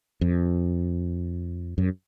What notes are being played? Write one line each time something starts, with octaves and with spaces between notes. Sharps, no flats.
F2
F#2